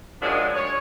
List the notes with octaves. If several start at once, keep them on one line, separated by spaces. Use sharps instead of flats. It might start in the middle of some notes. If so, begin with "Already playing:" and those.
D#3 F3 F#3 G#3 D4 D#4
C#5